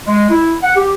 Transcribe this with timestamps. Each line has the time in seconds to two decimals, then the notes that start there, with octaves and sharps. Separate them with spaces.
0.07 G#3
0.29 E4
0.62 F#5
0.75 G4